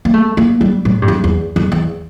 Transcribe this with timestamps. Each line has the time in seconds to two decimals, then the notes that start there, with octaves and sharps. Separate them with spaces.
0.05 A#3
0.14 A3
0.37 A#3
0.61 G3
0.85 A2
1.02 G2
1.08 F2
1.24 E2
1.56 F2
1.72 E2